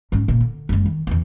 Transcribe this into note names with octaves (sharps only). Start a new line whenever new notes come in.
G#2 C#4
A#2 A#3
D3
F#1 G#3
D#3
E2 E3